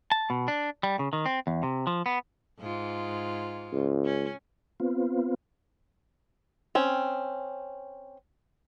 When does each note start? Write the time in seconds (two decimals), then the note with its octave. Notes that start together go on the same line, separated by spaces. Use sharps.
0.12 A5
0.30 B2
0.48 D4
0.83 G3
0.99 C#3
1.13 D#3
1.26 C4
1.47 E2
1.63 C3
1.87 F3
2.06 B3
2.60 G#2 F4
3.72 C#2
4.05 C#4
4.80 B3 C4 F4
6.75 C4 C#4